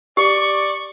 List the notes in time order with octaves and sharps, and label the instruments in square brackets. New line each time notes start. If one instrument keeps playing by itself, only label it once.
[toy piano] G4 [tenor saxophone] D5 [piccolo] C#6